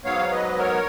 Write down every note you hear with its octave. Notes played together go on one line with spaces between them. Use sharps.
G#2 F#3 B3 C#5 F5
B4 D#5
A#4 C#5